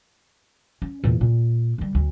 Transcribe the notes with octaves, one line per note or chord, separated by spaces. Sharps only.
C#4
E2 A#2
A#2
D3 G3
D2